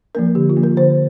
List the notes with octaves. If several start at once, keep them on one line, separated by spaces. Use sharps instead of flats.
F3 A#3 D4 A#4
D3 G4
F4
F3 A#3 D4
A#4
D3 C5